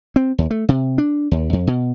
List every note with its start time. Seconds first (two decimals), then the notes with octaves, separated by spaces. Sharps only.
0.16 C4
0.38 D#2
0.51 A3
0.69 C3
0.98 D4
1.31 D#2
1.53 F2
1.67 B2